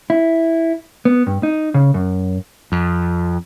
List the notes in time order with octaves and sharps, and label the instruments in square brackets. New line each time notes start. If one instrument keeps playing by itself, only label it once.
[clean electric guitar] E4
B3
G2
D#4
C#3
F#2
[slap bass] F2